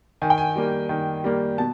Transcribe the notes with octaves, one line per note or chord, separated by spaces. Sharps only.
D#3 G#5
G5
G#5
G3 A#3
D#3
G3 A#3
B2 A5